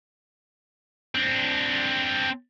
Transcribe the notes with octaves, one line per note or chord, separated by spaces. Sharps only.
C4 D4